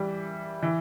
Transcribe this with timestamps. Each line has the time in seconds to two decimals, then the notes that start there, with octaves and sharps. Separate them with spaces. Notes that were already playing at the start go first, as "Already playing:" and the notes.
Already playing: E3 G3
0.62 E3